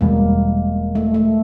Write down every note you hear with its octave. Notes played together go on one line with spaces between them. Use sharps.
E1 E2 B2 G3 G#3 A#3
A3
A3